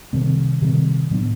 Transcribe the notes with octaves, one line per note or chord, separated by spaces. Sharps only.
C3 D#3 G3 C4
C3 D#3 G3 C4
A2 F#3 B3 D4